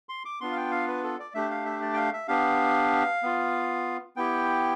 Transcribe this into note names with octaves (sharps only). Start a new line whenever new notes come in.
C6
D6
B3 D4 F4 C6
F5
G5
F5
B4
A4
D5
A3 D4 G4 E5
F5
E5
D5
G5
F5
E5
B3 D4 G4 F5
B3 F4
B3 E4 G4 G5